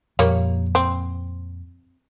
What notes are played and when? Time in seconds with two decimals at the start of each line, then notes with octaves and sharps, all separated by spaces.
0.19 F2 A#2 G3 A#3 C#5
0.75 C4